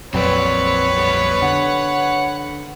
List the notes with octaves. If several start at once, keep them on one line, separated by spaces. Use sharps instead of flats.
A#1 F2 F#3 C4 B4 C#5 D5
G3 B3
D3 F#5